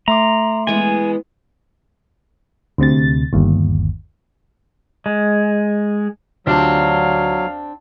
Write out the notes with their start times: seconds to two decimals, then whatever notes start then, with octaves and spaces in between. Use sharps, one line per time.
0.08 A3 E5 A#5 C6 D6
0.67 E3 G#3 B3 G#5
2.78 D2 C3 A6
3.33 G1 D#2
5.06 G#3
6.47 D2 F#3 C4 D4 F4 G4 F5